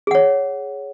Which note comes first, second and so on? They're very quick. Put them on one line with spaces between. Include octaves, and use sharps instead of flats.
G#4 F#5 C#5